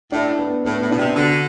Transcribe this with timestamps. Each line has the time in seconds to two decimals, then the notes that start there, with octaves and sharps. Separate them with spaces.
0.12 A2 D4
0.39 B3
0.64 A2 B3
0.81 A2
0.91 B2 D4
0.99 C3
1.16 D3 F#4